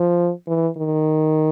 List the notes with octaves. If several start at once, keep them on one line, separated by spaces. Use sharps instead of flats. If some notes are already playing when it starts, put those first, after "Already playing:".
Already playing: F3
E3
D#3